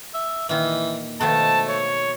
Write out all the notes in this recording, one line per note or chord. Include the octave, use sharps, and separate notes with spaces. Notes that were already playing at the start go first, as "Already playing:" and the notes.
E5
A#2 D#3 E3
B2 D#3 F3 A3 A5
C#5